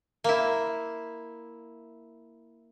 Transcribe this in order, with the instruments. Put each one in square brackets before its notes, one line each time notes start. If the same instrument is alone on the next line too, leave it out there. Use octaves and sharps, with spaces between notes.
[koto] A#3 E4